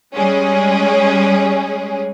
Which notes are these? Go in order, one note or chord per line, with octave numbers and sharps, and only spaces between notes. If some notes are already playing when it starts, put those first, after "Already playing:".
G3 G#3 C#4 G#4